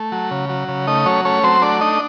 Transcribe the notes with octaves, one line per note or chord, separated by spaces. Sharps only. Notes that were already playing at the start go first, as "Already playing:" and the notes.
Already playing: A3
F#3
C#3
F#3
C#3
A3 D#4 D#5
F#3 C#4 C#5
A3 C#4 C#5
F#3 C4 C5
A3 D4 D5
D4 D#4 D#5